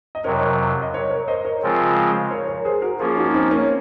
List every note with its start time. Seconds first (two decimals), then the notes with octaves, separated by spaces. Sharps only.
0.15 D#5
0.24 F2 C3 F#3 A#4 C#5
0.82 D#5
0.93 A#4 C#5
1.11 A#4 C#5
1.28 C5 D#5
1.45 A#4 C#5
1.62 C#3 F3 G#3 C4 F4
2.31 A#4 C#5
2.48 A#4 C#5
2.65 G#4 C5
2.82 F#4 A#4
3.00 F3 A#3 C#4 F4 G#4
3.17 D#4 F#4
3.34 C4 D#4
3.51 A#3 C#4